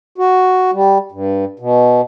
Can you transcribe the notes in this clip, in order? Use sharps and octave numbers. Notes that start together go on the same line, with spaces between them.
F#4
G3
G2
B2